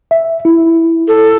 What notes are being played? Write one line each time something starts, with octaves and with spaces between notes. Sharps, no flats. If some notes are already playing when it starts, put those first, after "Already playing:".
E5
E4
A4